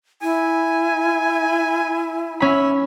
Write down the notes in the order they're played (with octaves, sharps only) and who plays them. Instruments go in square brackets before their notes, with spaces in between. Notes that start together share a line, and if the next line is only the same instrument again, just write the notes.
[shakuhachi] E4 [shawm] G#5
[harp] C#4 B5 [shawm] E5